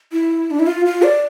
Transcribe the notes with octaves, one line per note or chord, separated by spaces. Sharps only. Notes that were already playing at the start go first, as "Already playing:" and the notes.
E4
D4
E4
F4
F4
D5